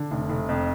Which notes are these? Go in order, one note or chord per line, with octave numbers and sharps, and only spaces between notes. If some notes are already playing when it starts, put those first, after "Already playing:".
Already playing: D3
F1
F1
F2